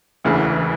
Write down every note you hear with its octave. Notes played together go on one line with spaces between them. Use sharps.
E1 D2 C#3 E3